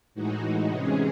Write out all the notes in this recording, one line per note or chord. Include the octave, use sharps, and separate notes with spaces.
A2 E3 G#3 D#4 F#4
C3 E3 G#3 C#4 G#4